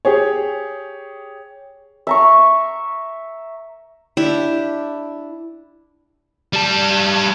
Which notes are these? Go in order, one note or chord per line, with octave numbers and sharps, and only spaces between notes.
G4 G#4 C#5
E5 A#5 C#6
D4 E4 G4
G3 A5